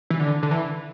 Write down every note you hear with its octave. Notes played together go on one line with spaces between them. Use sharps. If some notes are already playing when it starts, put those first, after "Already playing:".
E3
D3
D3
E3